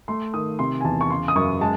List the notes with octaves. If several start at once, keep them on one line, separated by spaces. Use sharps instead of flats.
A3 C6
D#3 D#6
C3 C6
G#5
E2 A5
C#6
C#3 C6
D#6
F#2 C#6
G#3 A5